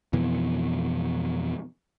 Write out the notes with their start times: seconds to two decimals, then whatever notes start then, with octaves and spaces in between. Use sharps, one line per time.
0.13 F2 B2 E3